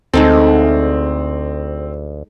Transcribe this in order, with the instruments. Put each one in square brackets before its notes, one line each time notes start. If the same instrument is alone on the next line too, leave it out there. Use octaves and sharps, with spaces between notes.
[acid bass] D2 [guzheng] G#3 D#4 A4 [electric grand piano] C4